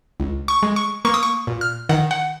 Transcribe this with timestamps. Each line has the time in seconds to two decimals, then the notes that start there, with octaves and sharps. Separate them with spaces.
0.20 C#2
0.48 C#6
0.63 G#3
0.76 C#6
1.05 A#3 C#6
1.14 D#6
1.23 C#6
1.47 A#2
1.61 F6
1.89 D#3 F#5
2.11 F#5